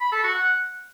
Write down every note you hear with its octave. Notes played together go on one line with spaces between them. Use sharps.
B5
A4
F#4
F#5